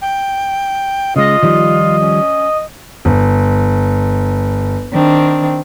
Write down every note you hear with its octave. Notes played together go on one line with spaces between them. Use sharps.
G5
C#3 G#3 F4 D#5
D#3 F3 G3
C#4
G1
D#3 C4 D4